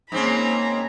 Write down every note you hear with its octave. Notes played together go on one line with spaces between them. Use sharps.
G#2 A#3 C4 C#4 A#5 B5